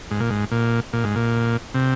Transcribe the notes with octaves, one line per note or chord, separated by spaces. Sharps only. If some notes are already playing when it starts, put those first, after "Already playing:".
G#2
A#2
G#2
A#2
A#2
G#2
A#2
C3